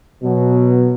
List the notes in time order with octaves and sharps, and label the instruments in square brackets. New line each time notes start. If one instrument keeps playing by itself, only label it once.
[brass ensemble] B2 F#3